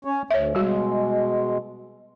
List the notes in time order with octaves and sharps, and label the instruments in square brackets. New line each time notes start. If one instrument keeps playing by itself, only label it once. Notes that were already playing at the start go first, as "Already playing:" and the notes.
[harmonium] C#4 C#5
[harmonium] D2 [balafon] C#5 E5
[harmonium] B2 G#3 [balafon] G3 F#4